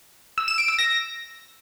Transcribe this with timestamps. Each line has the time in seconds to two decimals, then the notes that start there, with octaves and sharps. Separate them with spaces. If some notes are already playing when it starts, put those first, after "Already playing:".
0.38 E6
0.48 E7
0.58 D7
0.68 E6
0.79 A#6